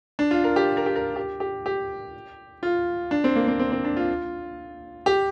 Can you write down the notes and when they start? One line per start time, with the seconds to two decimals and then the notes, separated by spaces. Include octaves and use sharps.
0.19 D4
0.31 F4
0.44 A#4
0.56 G4
0.77 A#4
0.86 G4
0.96 A#4
1.16 G4
1.40 G4
1.66 G4
2.63 F4
3.11 D4
3.24 C4
3.36 A#3
3.48 C4
3.59 C4
3.72 C4
3.84 D4
3.97 F4
5.06 G4